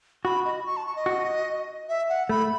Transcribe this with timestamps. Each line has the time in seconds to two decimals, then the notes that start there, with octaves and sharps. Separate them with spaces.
0.25 F#4 B5
0.45 D#5
0.66 C#6
0.77 A5
0.86 C#6
0.96 D#5
1.06 F#4
1.89 E5
2.09 F#5
2.29 A3 B5